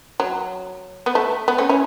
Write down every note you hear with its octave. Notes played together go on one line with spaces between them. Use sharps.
F#3
B3
A3
B3
A3 C#4
C#4 E4